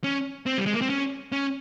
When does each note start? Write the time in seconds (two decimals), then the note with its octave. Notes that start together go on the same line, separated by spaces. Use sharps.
0.04 C#4
0.46 C4
0.58 G3
0.66 G#3
0.74 A#3
0.81 C4
0.90 C#4
1.32 C#4